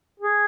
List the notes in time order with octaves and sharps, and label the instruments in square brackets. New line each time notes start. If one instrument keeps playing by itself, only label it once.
[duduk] G#4